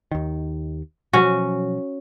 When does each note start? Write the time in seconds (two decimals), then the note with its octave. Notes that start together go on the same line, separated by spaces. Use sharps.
0.11 D#2 D#3
1.13 B2 F3 F#3 C#4 F#4